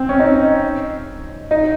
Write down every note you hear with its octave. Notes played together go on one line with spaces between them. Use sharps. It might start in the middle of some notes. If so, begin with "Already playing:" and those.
Already playing: C4
C#4
D#4
D#4